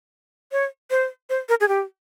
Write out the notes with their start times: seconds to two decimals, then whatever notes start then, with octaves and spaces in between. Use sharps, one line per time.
0.52 C#5
0.91 C5
1.30 C5
1.49 A#4
1.61 G#4
1.68 G4